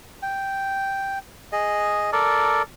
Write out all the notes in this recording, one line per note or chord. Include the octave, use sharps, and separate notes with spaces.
G5
G#4 D#5
A4 A#4 D5